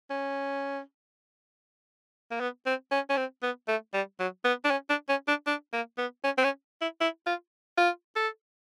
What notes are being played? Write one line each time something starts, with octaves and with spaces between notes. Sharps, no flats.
C#4
A#3
B3
C4
C#4
C#4
C4
B3
A3
G3
F#3
B3
D4
C#4
D4
C#4
D4
D4
A#3
B3
C#4
C4
C#4
E4
E4
F4
F4
A4